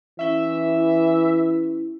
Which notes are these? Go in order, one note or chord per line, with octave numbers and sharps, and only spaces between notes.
E3 C#4 E4 E5